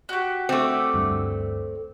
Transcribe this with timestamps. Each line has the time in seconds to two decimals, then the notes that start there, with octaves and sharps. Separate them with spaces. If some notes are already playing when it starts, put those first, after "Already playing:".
0.09 F#4 G4
0.49 A3 C4 D5
0.93 D2 G2